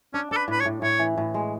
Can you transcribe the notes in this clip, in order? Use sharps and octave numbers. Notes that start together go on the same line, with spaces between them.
C#4 D4
D4 A4
B4
A2 B4
C#5
A2
A2 C#5
E3
A2
G#3